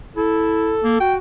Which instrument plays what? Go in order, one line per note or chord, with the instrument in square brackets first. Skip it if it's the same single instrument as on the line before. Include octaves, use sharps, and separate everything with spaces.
[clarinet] E4 [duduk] A4
[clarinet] A#3
[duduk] F#4 [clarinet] G5